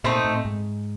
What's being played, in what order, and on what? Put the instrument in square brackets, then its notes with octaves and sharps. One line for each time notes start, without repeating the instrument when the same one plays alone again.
[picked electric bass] A#2 [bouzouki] A3 C4 D#4
[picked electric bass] A2
G#2